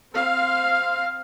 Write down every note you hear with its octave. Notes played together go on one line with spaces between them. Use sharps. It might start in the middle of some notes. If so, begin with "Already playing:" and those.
C4 F5